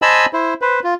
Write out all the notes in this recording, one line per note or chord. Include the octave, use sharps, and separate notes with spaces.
C5 D#5 G#5 A5 B5 E6
E4 C5
B4 C5
F4